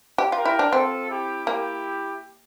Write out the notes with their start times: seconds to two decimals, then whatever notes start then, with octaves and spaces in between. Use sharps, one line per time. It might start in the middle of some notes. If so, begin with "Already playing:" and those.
0.18 G4
0.32 F4 G4 A#4
0.45 E4
0.59 D4
0.72 C4 F4 A4
1.10 E4 G4
1.47 A#3 E4 G4